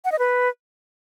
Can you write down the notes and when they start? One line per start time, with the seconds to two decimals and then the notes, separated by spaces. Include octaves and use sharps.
0.05 F#5
0.12 D#5
0.19 B4